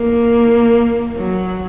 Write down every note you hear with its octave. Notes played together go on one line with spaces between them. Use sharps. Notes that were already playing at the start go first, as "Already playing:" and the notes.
Already playing: A#3
F#3